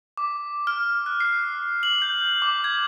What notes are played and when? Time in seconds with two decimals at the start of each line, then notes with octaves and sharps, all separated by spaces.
0.17 D6
0.67 F6
1.06 F#6
1.20 C7
1.83 F#7
2.02 G6
2.42 D6
2.64 G#6